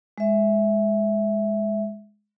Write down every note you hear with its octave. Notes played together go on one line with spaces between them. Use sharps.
G#3 E5